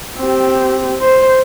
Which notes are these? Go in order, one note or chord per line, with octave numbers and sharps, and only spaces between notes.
C4 G4
C5